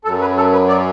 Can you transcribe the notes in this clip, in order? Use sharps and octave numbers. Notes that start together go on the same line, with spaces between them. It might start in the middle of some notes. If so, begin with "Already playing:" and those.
F#2 F#3 A4
B4
A4
B4
D5